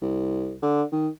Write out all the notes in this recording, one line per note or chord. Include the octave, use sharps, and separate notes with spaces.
C2
D3
D#3